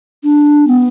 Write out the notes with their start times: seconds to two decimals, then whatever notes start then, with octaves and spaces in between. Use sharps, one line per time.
0.24 D4
0.67 B3